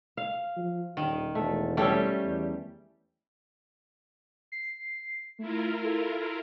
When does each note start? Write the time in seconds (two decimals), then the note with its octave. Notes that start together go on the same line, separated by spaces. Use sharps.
0.17 F5
0.57 F3
0.97 D#1 D#3
1.35 E1 A3
1.77 G3 A3 C#4 G4 A4
2.24 E2
4.52 C7
5.39 A3 E4 F4 A#4
5.84 A4